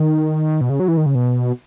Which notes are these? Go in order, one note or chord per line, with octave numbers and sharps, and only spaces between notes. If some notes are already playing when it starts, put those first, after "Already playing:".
Already playing: D#3
B2
C#3
F#3
E3
D#3
C#3
B2